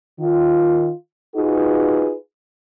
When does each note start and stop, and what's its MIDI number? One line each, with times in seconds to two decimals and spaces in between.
0.20 0.91 51
0.20 0.91 65
1.36 2.15 63
1.36 2.15 65
1.36 2.15 66
1.36 2.15 68
1.36 2.15 71